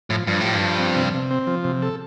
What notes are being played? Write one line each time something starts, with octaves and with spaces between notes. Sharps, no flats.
A2 F3
G2 F3
A2 G4
G2
F3
C4
C3
C3
C4
F3
C3
A4